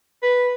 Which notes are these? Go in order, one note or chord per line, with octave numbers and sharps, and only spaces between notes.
B4